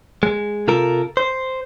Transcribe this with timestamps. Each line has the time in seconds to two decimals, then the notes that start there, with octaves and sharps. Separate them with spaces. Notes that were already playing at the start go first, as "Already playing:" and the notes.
0.23 G#3
0.68 C3 F4 A4 A#4
1.17 C5